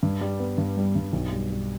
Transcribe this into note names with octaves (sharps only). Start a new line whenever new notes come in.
G2
G3
B3
G2
G3
G2
B1
G3
G3